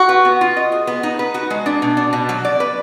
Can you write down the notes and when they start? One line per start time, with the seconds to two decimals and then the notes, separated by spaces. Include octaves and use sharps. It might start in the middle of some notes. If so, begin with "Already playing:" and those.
Already playing: F#4
0.09 B4
0.25 B3
0.41 F4
0.57 D#5
0.72 G#4
0.87 B3
1.03 D#4
1.19 B4
1.34 F#4
1.50 G#3
1.66 D4
1.82 B2
1.97 D4
2.13 B2
2.29 F#3
2.45 D5
2.60 B4